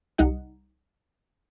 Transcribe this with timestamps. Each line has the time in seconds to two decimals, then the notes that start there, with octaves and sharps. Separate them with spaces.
0.18 C2 G3 D#4 F#5